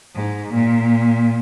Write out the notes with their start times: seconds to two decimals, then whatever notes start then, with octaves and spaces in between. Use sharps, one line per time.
0.15 G#2
0.53 A#2